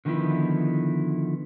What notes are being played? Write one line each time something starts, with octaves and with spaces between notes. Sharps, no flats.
D3 D#3 F3 B3 E4